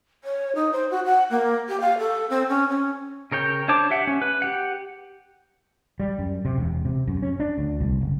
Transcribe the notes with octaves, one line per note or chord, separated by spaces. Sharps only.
C#5
D#4
C5
F#4
F#5
A#3
G4
F5
A4
C4
C#4
C#4
C#3 A#4 C#5 G5
D4 C5 C#5 A5 D6
G4 E5 F#5
C#4
B4
G4 F#5
G3
F#2
C3
E1
C3
F#2
C#4
D4
D2
C2
F#1